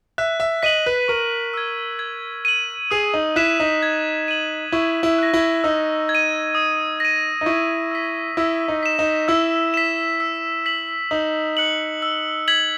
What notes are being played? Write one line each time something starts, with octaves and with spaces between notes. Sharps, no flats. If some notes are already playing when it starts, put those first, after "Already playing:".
E5 F#6
E5
D#5 B6 D#7 F#7
B4
A#4 C#6
E6 G#6
G#6
D#7 F#7
G#4 D#6
D#4
E4 F#6 B6 E7
D#4
G#6
D#7 F#7
E4 C#6
E4
F#6 A#6
E4
D#4 E6
G#6
D#7
D#6
A#6 D#7
D#4
E4 C#6
E6 B6
E4 E6
D#4
B6 E7
D#4
E4 E6
B6 E7
E6
B6 F#7
D#4 D#6
F#6 C#7 F#7
E6
G#6 B6 F#7